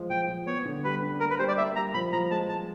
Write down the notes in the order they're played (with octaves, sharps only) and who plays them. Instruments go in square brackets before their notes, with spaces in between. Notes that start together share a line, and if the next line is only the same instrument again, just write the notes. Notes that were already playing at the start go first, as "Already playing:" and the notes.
Already playing: [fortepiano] F3 G#3
[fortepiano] F3 [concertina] G5
[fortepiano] F3
[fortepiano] B3 [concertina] C#5
[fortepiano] D3
[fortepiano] G3 [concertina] B4
[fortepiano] D4
[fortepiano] A#3 [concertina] A#4
[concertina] B4
[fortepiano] G3 [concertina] C5
[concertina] D5
[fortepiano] A#3 [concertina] E5
[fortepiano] G3 [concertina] A#5
[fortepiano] F3 [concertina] B5
[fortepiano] F3 [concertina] A#5
[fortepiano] G#3 [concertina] A5
[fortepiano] F3 [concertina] A5